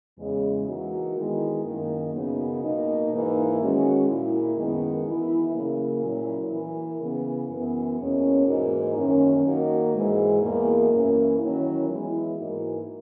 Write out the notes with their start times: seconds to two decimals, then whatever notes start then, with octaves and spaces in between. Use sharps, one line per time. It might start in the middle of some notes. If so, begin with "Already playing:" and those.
0.18 E2 C#3 G#3
0.67 E3 A#3 D#4 F#4
1.16 D#3 G#3 B3 E4
1.64 F#2 D#3 A#3
2.13 F#2 C#3 F#3 B3 D#4
2.62 B2 A#3 D#4
3.10 G#2 E3 A#3 D#4
3.59 D#3 G#3 C#4 F#4
4.08 A#2 A#3 E4
4.57 F#2 D#3 G#3 B3
5.06 E3 B3 E4
5.54 C#3 F#3 A#3
6.03 A#2 F#3 C#4 E4
6.52 E3 A#3 E4
7.00 C#3 E3 B3
7.49 F#2 E3 B3
7.98 E2 B2 A#3 C#4
8.47 G#2 E3 A#3 D#4 F#4
8.96 F#2 D#3 A#3 C#4
9.45 D#3 A#3 D#4 F#4
9.93 G#2 E3 G#3
10.42 E2 B2 A#3
10.91 F#2 E3 A#3 C#4 E4
11.39 D#3 F#3 C#4 E4
11.88 E3 G#3 B3 E4
12.37 G#2 E3 A#3 D#4 F#4